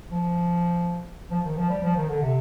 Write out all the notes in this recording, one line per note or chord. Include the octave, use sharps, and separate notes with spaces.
F3
F3
D#3
F3
G3
F3
D#3
D3
C3